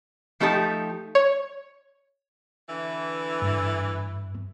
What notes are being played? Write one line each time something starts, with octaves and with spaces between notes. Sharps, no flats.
F3 A3 D#4 G4 B4 A5
C#5
D3 E3
G2